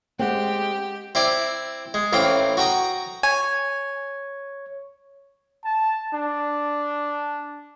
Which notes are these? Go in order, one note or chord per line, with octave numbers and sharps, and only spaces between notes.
G#3 C4 G4 F#5
C4 E4 D5
G#3
A1 E3 C4 F5 G5
F#4 G5 A#5 D#6
C#5 G#5
A5
D4